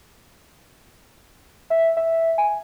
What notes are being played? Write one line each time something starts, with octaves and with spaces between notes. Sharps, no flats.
E5
E5
G#5